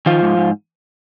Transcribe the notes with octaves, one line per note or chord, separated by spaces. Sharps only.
D#3 F3 F4
G#2
G#2